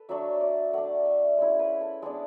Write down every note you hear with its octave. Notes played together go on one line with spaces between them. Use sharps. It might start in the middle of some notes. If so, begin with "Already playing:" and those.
Already playing: A4 B4
F#3 A3 D4 E5
D5
A3 D4 F#5
E5
G#3 C#4 E4
B4
A4
G#3 B3 D4 A4